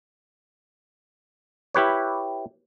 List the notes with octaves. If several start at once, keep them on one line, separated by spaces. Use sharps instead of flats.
E4 G4 B4 C#5